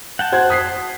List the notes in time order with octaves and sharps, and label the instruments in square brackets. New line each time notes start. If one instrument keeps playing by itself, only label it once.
[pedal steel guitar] F#5 G5 A5
[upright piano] F#4 C5 G#6
D#6 B6 C7